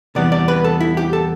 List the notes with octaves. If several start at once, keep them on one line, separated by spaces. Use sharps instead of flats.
E2 C3 E3 G3 B3 D5
D5
B4
A4
E4
G4
A4